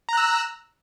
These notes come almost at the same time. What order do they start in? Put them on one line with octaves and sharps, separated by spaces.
A#5 F#6 E6